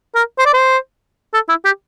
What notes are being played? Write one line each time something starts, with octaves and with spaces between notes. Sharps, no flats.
A#4
C5
D5
C5
A4
E4
G4